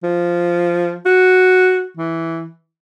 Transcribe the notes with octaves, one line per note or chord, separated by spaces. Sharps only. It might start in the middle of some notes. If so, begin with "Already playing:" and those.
F3
F#4
E3